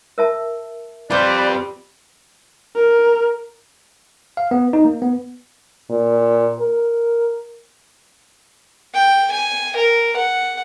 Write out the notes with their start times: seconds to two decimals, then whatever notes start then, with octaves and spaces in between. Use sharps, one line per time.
0.18 A#4 E5 A5
1.10 G3 C4 F4 B4 C5 D5
2.76 A#4
4.37 F5
4.51 B3
4.73 D#4
4.85 A#3
5.02 B3
5.90 A#2
6.60 A#4
8.94 G5
9.32 G#5
9.76 A#4
10.16 F#5